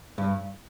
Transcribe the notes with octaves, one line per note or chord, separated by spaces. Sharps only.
G2